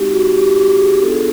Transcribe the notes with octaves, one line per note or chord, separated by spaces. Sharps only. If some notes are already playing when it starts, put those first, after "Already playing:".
Already playing: G#3 C4 D#4 F#4 G4
F#4
G4
G4
G#4
B3 D4 F4 A4
G#4